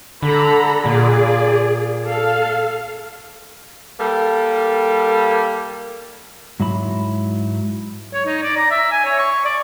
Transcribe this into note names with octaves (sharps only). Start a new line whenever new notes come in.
D3 A4 A#5 B5
A#2 G#4 D5
A4 F5
G3 A#3 A4
G#2 F#3 E4 B5
C#5
D#4
D5
A#5
E5
G#5
C#5
C#6
D5